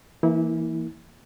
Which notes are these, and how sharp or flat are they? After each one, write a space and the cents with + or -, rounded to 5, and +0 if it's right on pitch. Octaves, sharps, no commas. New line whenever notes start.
E3 +10 A#3 +0 E4 -30